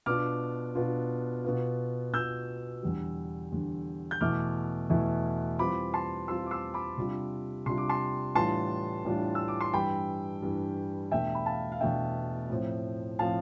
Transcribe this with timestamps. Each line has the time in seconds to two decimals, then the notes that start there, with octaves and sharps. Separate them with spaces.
0.06 B2 B3 D4 F4 D6 F6
0.75 B2 B3 D4 F4
1.44 B2 B3 F4
2.13 B2 B3 F4 E6 G6
2.83 E2 D3 G3
3.51 E2 D3 G3
4.11 G6
4.21 E2 B2 A3 E4 D6 F6
4.90 E2 B2 A3 E4
5.59 E3 G3 C4 F4 B5 D6
5.94 A5 C6
6.28 E3 G3 C4 F4 C6 E6
6.46 D6
6.51 C6 E6
6.74 B5 D6
6.97 C3 G3 D4 F4
7.66 C3 G3 D4 F4 C6
7.78 D6
7.89 A5 C6
8.35 A2 E3 G3 D4 F4 A5 C6
9.05 A2 E3 G3 D4 F4
9.35 E6
9.48 D6
9.60 C6
9.73 G2 E3 G3 G5 B5
10.42 G2 E3 G3
11.11 E2 B2 A3 D4 E5 G5
11.35 B5
11.46 F5 A5
11.72 F5
11.81 E2 B2 A3 D4 E5 G5
12.50 A2 F3 C4
13.19 A2 F3 C4 F5 A5